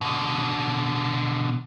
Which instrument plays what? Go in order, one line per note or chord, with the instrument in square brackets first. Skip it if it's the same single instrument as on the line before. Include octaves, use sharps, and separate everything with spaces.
[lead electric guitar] B2 D3